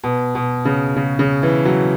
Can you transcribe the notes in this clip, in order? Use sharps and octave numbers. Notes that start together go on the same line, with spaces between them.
B2
B2
C#3
C#3
C#3
E3
F#3